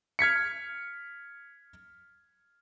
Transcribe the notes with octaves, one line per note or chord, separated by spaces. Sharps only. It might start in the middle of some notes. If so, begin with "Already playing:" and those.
F6 G#6 B6 C#7